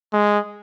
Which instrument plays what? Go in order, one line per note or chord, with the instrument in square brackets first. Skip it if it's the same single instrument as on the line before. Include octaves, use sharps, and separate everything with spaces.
[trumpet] G#3